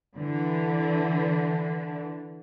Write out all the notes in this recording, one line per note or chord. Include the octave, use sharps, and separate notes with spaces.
D3 E3